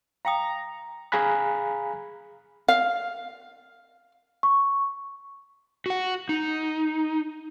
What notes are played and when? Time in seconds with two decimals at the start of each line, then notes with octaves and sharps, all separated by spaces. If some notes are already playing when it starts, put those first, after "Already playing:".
0.25 F5 G5 A#5 D#6
1.12 G#4 F5 G#5 A#5 B5 F#6
2.68 F5
4.43 C#6
5.86 F#4 F#5
6.29 D#4